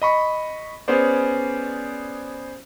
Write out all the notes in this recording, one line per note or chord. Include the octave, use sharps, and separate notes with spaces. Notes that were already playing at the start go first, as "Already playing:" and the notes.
D#5 B5 C#6
B3 C#4 G#4 C5 D5